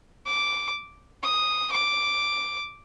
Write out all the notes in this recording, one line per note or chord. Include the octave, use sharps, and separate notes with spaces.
D6
D#6
D6